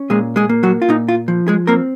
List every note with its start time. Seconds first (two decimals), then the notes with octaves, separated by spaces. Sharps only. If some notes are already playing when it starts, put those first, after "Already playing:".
Already playing: C#4
0.10 A#2 G#3 G#4
0.36 G#3 G#4
0.49 A#3
0.63 F#3 F#4
0.82 F4
0.89 A#2 D#4
1.08 F4
1.28 F3
1.48 G#3 G#4
1.67 A#3 C4 A#4